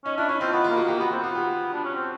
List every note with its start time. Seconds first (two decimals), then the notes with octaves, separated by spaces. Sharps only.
0.05 C#4 D#4
0.18 D4 E4
0.29 C#4 D#4
0.41 C4 F4
0.53 B3 F4
0.64 A#3 F4
0.77 F#4
0.84 A#3 G4
0.99 B3 F#4
1.11 C4 F#4
1.23 B3 F4
1.35 G4
1.73 D4
1.84 C#4
1.95 C4